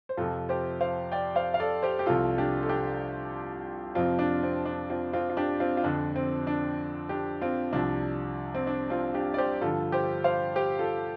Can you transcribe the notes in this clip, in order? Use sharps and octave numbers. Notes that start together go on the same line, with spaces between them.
C5
F2 C3 F3 F4 A4
G4 C5
C5 F5
D5 G5
C5 F5
F5
A4 D5
G4 C5
G4
C2 C3 F3 F4 A4
D4 G4
A4
D4 G4
F2 C3 F3 C4 F4
D4
C4
D4
C4 F4
C4 F4
F4
D4 G4
C4 F4
F4
F2 D3 F3 D4
C4
D4
D4 G4
C4 F4
C2 C3 F3 D4
C4
D4
C4 F4
D4 G4
D5
G4 C5
G2 D3 F3 F4 A4
G4 C5
C5 F5
G4 C5
F4 A4